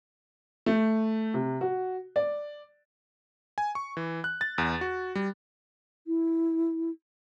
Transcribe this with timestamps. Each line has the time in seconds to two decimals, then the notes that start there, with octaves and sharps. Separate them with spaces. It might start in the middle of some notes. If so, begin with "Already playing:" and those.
0.66 A3
1.34 C3
1.61 F#4
2.16 D5
3.58 G#5
3.75 C#6
3.97 E3
4.24 F#6
4.41 A6
4.58 E2
4.81 F#4
5.15 G3
6.07 E4